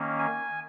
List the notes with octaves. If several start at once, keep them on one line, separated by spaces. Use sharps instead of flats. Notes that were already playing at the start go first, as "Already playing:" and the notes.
Already playing: D#3 A#3 C#4
G#5